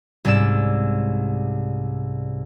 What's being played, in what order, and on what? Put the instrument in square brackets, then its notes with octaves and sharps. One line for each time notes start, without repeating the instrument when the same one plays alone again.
[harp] C2 G#2 C#4 D5 E6 E7